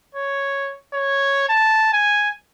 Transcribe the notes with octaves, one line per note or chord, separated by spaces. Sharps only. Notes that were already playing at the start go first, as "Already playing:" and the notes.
C#5
C#5
A5
G#5